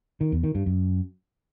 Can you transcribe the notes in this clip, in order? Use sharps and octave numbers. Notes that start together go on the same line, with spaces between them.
D#3
E2
D#3
G2
F#2